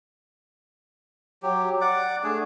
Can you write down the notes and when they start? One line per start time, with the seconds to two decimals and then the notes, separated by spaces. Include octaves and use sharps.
1.43 F#3 G4
1.81 D5 F#5 D6
2.23 A3 D4 G#4